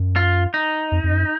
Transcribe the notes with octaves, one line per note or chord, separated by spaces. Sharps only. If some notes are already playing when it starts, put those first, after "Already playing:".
Already playing: F#2
F4
D#4
F2
F2
F#2